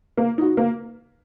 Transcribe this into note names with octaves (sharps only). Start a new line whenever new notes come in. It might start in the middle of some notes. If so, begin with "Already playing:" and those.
A#3
D#4 F#4
A#3